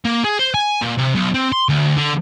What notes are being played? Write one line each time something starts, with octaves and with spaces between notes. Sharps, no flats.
A#3
G#4
C5
G#5
A#2
C3
B1
C4
C6
D2
D3